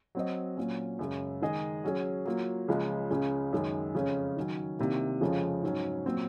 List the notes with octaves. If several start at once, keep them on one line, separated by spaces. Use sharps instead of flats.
F#3 C4 F#4 C5 D#5
A#2 F#3 C#4
F#2 C#3 G#3
D#3 G#3 D#4 G#4 D#5
F#3 C#4 G#4
F#3 A#3 F4
C#2 C#3 F3 G#3
C#2 C#3 G#3 C#4
F#2 D#3 G#3
F2 C#3 G#3 C#4
D#3 F#3 C#4
C2 C3 D#3 A#3
F2 C#3 F3 G#3 C#4
G#2 F#3 C#4
A#2 F#3 C4